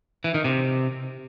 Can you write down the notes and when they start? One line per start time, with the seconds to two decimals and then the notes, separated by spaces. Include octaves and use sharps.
0.24 E3
0.34 D#3
0.44 C3